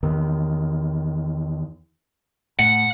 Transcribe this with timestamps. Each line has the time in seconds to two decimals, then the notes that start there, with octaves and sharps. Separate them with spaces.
0.03 E2 D#3
2.59 A2 F#5